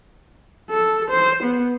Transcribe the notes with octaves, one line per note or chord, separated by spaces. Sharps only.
A4
C5
B3